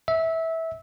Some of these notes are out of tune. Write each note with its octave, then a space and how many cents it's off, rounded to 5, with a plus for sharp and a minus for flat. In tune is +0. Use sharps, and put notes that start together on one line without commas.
E5 -20